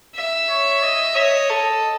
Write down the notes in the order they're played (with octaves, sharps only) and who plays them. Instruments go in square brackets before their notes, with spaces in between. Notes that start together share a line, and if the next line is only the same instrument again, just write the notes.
[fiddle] E5
[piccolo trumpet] C#5
D#5
[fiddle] C#5 [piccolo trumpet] D#5
[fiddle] A4